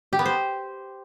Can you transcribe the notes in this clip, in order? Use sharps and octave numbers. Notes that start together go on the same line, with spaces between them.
G4
B3
C5